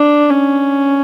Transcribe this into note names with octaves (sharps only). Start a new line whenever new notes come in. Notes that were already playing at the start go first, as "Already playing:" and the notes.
Already playing: D4
C#4